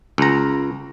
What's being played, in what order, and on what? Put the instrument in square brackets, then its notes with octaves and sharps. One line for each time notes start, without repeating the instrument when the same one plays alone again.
[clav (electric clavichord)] C#2 A#5